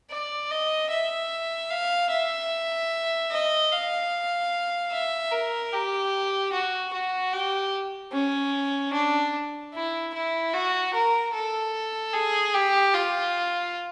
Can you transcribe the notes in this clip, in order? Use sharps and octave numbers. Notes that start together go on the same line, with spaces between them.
D5
D#5
E5
F5
E5
D#5
F5
E5
A#4
G4
F#4
F#4
G4
C#4
D4
E4
E4
F#4
A#4
A4
G#4
G4
F4